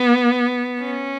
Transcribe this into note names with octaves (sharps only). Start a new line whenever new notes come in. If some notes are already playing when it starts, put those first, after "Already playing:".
Already playing: B3
C#4